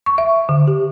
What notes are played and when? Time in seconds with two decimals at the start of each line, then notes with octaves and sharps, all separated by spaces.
0.06 C#6
0.18 E5
0.49 D3
0.67 G4